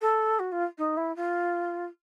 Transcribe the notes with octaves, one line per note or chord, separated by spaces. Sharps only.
A4
F#4
F4
D#4
E4
F4